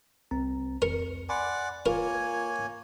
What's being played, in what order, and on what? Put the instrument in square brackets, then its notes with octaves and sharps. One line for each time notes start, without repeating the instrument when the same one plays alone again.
[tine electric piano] C2 C4 A#5
[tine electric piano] F2 C#7 [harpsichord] A#4
[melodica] D5 F#5 D6 [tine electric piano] G#5 B5 C6
[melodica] A#3 C#5 G#5 [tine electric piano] F4 [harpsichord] A#4